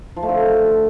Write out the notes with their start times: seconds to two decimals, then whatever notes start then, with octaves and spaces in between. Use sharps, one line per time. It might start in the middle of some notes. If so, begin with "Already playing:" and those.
0.17 F3
0.23 A3
0.29 D3